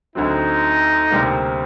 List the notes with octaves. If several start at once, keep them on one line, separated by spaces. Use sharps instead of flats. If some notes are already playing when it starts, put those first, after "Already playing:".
D2 D3 F#3 C4 D#4
D2 C3 G3 A#3